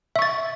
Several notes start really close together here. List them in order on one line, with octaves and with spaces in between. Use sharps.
E5 C#6 A6